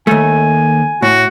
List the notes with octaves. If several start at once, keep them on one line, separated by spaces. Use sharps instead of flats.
D#2 A3 G#5
A2 F#4